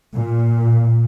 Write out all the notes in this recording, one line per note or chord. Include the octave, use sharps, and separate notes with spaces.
A#2